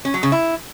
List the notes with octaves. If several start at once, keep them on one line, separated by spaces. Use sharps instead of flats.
C#4
F#3
C#3
E4